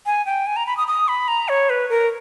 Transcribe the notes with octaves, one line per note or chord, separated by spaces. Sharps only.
G#5
G5
G#5
A#5
B5
D#6
D#6
B5
A#5
C#5
B4
A#4